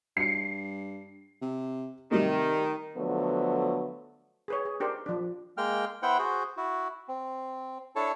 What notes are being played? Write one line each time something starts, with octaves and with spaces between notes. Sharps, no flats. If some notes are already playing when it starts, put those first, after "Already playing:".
G2 C7 C#7
C3
C3 D#3 G3 A3
D3 F3 F#3 A3 B3
G#4 B4 C#5
G#4
D4 G4 A#4 C5
F3 D4
G#3 A#3 G5 F6
B3 E4 C5 F#5 G5
F#4 G#4 C5
E4 F#4
C4
D4 E4 A4 C#5 A5